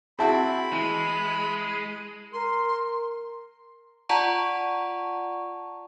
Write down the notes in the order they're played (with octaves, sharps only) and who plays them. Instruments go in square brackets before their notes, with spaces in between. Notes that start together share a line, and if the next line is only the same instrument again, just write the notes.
[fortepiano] C4 E4 F#4 [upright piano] G#4 E5 A5 [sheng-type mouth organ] B5
[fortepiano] E3 [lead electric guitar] G#3
[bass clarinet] A#4 [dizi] C6
[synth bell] F4 D5 F#5 A5 A#5 C#6